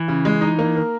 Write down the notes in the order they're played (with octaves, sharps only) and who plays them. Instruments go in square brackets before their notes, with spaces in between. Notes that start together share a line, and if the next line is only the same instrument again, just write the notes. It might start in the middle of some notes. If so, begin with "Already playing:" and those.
Already playing: [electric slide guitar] E3
[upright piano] C#3
G#3
D#4
A#3
A#4